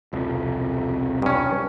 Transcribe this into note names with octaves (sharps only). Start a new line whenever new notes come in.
E1 C2 F2
G2 C#4